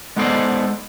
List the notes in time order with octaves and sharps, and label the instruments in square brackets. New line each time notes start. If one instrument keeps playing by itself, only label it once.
[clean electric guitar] G#3 B3 D#4 A4 C5 D5